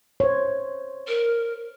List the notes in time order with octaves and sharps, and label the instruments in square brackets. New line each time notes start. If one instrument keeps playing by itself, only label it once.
[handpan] C5 C#5
[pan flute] A#4